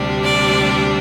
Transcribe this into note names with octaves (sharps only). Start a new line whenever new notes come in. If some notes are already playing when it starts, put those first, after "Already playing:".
Already playing: D2 C3 G3 D4
D5